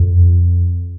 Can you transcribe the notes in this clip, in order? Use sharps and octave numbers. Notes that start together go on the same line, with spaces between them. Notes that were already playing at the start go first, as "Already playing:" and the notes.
Already playing: F2